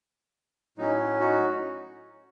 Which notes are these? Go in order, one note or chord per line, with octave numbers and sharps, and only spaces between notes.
A2 F#3 C#4 D#4
D#4 F#4